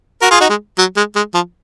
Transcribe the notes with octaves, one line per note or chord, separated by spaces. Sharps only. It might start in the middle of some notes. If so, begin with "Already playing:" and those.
F#4 A#4
F4 G#4
D#4 F#4
G#3
F#3
G#3
G#3
F3